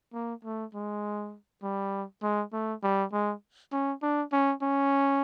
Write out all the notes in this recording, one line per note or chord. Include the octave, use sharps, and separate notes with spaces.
A#3
A3
G#3
G3
G#3
A3
G3
G#3
C#4
D4
C#4
C#4